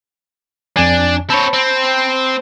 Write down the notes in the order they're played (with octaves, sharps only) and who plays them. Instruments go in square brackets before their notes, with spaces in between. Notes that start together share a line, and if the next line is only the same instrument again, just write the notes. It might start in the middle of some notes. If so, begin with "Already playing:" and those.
[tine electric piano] F2 G#5 [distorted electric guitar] D4
[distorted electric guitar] C4 C#5 [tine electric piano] A5 B5
[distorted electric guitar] C4